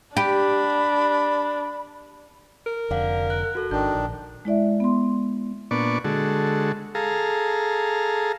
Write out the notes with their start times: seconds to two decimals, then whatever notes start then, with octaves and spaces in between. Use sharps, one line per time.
0.17 D4 G4 B5
2.66 A#4
2.91 F1 F2 D3 D5 F5 F#5
3.30 F#6
3.55 F#4 A4
3.71 G#1 D#3 D4 G6
3.95 A#1
4.45 G#3 E4 D5 E5
4.80 B3 C6
5.71 A#2 B3 D4 D5 C#6
6.04 D3 G#3 F#4 A4
6.95 G#4 A4 F5 A#5